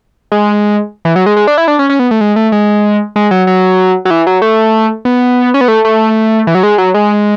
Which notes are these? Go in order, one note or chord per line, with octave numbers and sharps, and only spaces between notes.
G#3
E3
F#3
G#3
G#3
D4
E4
D4
C#4
C#4
B3
A3
G#3
A3
G#3
G#3
F#3
F#3
F#3
E3
F#3
A3
B3
C#4
B3
A3
A3
E3
F#3
G#3
F#3
G#3